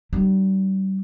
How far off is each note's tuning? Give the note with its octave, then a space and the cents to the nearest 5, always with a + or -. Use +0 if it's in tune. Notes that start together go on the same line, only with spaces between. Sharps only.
G3 -35 D4 +40